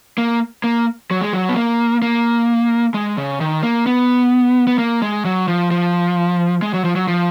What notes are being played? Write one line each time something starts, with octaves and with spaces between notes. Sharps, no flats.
A#3
A#3
F#3
G#3
F#3
B3
A#3
A#3
G#3
C#3
D#3
A#3
B3
B3
A#3
G#3
F#3
F3
F3
G#3
F#3
F3
F#3
F3